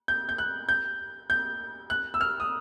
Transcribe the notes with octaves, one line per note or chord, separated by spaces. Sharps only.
G6
G6
F#6
G6
G6
F#6
E6
F6
D#6